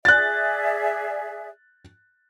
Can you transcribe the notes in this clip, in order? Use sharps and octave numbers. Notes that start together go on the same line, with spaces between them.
G#4 D5 E5 F#6 A6